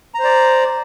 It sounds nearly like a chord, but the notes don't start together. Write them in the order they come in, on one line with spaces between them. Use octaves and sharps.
A#5 C5 D5